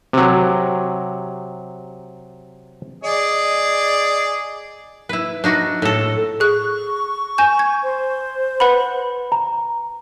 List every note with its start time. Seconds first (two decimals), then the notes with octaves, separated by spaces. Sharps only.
0.13 C3 F#3
3.04 G#4 D5 D#5
5.09 E4 B4
5.44 D4 D#4 F#4
5.82 A2 A4
6.40 G#4 C#6 F#6
7.38 G#5 G6 E7
7.59 G#6
7.83 C5
8.60 B4 F#5 B5
9.32 A#5